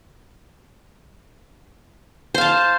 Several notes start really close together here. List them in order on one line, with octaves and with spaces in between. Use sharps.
C5 F5 A5